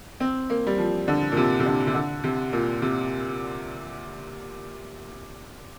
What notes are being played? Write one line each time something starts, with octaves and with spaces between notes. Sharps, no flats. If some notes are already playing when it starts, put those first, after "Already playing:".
C4
A#3
G3
F3
D3
A#2
C3
C3
D3
C3
D3
C3
A#2
C3